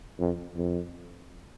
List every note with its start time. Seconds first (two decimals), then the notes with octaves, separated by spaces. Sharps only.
0.19 F2
0.57 F2